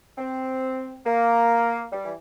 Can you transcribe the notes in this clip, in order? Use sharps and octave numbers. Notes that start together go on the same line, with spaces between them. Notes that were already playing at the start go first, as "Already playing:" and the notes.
C4
A#3
G3
E3